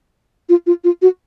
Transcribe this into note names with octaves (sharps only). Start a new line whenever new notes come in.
F4
F4
F4
F#4